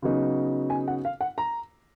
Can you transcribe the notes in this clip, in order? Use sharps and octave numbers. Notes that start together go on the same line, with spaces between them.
C#3 F#3 B3 D#4
G#5
F#5
F5
F#5
A#5